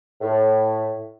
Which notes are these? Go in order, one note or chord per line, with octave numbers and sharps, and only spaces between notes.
A2